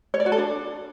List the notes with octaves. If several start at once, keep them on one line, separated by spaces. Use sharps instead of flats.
C#5
D5
F#4
A4
D4